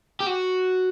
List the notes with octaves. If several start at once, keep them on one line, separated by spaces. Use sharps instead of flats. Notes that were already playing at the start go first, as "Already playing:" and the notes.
G4
F#4